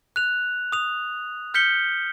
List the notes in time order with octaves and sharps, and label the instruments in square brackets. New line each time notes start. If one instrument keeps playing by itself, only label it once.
[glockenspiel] F#6 F7
D#6 F7
F6 G6 B6 C#7 G7